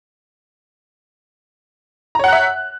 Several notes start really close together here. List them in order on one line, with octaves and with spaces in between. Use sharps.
A#5 C#5 F#5 F#6 E5